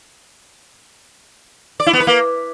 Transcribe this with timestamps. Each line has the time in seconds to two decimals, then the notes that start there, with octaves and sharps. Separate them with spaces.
1.80 D5
1.86 E4
1.93 B3
2.00 B4
2.07 A#3